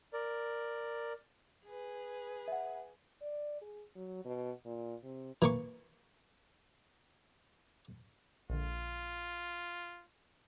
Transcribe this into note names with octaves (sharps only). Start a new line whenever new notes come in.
A#4 D5
G#4 B4
E5 F#5
D5
G#4
F#3
B2
A#2
C3
E3 A#3 C#6
A#1 D3 F4